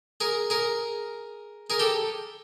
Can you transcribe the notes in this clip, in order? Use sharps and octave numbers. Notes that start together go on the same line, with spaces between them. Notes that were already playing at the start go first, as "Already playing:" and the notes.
G#4 A#4
G#4 A#4
G#4 A#4
G4 A4